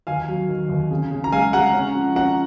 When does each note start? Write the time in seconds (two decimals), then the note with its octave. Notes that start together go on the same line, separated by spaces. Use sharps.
0.07 D#2 F5 G#5
0.28 F#3
0.49 D#3
0.69 D#2
0.91 C#3
1.11 C#3
1.24 A#5
1.32 G#3 F5 G#5
1.53 G#3 F#5 A#5
1.74 C#4
1.95 F3
2.16 C#4 F#5 A#5